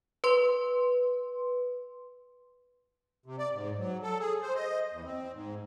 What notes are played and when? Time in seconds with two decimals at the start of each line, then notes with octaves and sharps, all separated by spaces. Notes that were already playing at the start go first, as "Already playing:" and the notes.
0.24 B4 C6
3.26 C3
3.39 D5
3.54 G#2
3.78 F#3
4.03 A4
4.20 G#4
4.42 C5
4.55 D#5
4.93 E2
5.05 C4
5.32 G#2